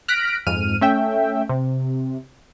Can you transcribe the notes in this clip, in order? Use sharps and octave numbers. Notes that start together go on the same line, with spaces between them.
F6 F#6 A#6 B6 D7
F2 G#2 F6 D#7
A3 C#4 E5 G5
C3